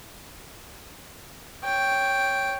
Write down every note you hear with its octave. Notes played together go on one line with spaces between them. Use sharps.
C#5 G5